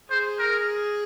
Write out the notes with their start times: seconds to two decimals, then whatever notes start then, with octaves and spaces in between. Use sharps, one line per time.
0.10 G#4 C5
0.39 A#4